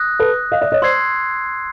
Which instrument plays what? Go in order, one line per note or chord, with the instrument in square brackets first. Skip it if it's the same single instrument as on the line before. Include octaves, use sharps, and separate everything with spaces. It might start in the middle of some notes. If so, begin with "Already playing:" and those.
Already playing: [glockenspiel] D#6 F#6 A#6
[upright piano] A4 B4
D#5 F5
D5 E5
C#5 D#5
[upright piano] C5 D5 [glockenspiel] C6 E6 G#6 C7